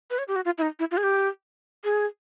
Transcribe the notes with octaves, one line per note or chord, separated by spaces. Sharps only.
B4
C#5
G4
F#4
F4
E4
D#4
E4
F4
G#4
G4
G#4